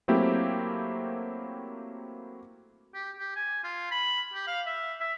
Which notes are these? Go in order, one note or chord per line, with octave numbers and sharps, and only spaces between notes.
F#3 A3 A#3 C4 E4 G4
G4
G4
G#5
F4
B5
G4
F5
E5
E5